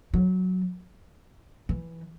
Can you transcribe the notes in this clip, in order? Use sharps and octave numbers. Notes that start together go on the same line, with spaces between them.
F#3
E3